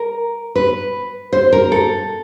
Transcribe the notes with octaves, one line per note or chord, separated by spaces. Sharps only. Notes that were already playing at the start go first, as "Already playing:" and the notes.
Already playing: A#4
B4
C5
A#4
A4